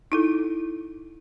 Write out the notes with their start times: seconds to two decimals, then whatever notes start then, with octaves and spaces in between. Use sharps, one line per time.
0.12 D#4 E4 A4